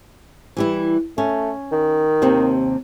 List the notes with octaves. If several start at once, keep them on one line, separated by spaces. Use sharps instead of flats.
E3 G3 E4
A3 C#4
D#3
D#2 C3 C4